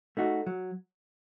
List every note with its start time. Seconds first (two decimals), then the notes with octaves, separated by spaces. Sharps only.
0.17 A3 D#4 F#4
0.47 F#3